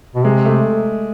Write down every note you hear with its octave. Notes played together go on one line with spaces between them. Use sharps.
B2
C3 G#3
A3